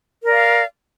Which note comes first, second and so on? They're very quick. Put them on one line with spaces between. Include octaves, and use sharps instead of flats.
A#4 D5 F5